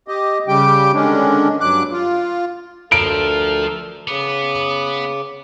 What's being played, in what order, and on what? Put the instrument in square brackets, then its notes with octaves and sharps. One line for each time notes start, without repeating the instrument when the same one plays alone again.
[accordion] G4 D#5
C#3 G3 G4 G5
D3 D#3 G#3 C#4 D4
G2 F#3 D6 F#6
F4
[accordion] D2 A4 A#4 [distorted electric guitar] F3 [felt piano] D7
[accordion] C#3 D6 [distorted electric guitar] B3